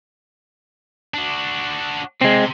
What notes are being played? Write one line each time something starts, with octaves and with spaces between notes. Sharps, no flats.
D4 F#4
C3 G#3 C4